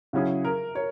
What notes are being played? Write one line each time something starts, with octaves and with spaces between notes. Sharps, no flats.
C#3 F#3 C#4 E4 G#4
A#4
A#4 C#5